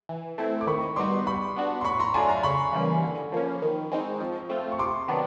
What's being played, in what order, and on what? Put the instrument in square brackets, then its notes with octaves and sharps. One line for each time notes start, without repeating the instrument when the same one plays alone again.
[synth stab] E3
A3 C4 E4
[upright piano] D6
[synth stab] D#3 [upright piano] B5 C#6
[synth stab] G3 B3 D#4 F#4 [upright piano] C6 D6
[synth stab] G3 [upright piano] B5 C#6
[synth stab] B3 D4 F#4
[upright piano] C6
[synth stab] A2 [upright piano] B5 C#6
[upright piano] A#5 C6
[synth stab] F#3 A3 D4 F4 [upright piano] G#5 A#5
[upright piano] A#5 C6
[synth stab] C#3 [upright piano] B5 C#6
[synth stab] E3 G3 A#3 C#4
D3
F3 A#3 C#4
D#3
G#3 C4 D#4
F3
A3 C4 F4
[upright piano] C#6
[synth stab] C3 [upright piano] C6 D6
[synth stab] D#3 F#3 B3 D4